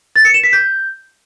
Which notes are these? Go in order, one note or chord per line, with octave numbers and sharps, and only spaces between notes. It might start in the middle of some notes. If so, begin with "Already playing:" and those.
A6
C#7
E7
B6
G6